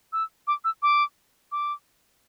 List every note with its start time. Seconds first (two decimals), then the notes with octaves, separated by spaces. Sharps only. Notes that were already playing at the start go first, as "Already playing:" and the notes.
0.13 E6
0.47 D6
0.65 E6
0.83 D6
1.52 D6